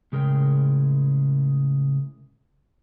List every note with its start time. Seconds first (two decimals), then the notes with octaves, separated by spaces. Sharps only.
0.12 A2 C#3 G#3 A#4 C#5 G5